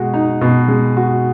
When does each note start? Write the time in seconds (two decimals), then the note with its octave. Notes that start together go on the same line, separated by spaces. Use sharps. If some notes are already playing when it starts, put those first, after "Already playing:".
Already playing: B2 G#3 F#4
0.14 D#4
0.41 B2
0.68 G#3
0.97 F#4